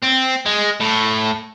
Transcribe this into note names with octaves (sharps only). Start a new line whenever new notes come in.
C4
G#3
A2